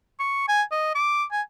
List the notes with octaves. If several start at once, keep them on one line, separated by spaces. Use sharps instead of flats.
C#6
G#5
D#5
D6
G#5